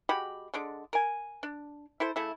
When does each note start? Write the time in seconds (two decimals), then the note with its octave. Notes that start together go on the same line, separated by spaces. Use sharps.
0.09 G#3 F#4 G4 B5
0.54 D3 G#3 D4
0.93 A#4 G#5
1.43 D4
2.00 E4 A4 C5
2.16 C#3 A3 E4